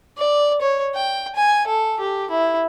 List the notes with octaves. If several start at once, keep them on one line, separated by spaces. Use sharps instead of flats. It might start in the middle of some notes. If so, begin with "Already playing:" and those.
D5
C#5
G5
G#5
A4
G4
E4